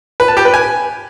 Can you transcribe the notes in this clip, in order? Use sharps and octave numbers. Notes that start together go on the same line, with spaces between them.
B4
A5
G4
B4
G#5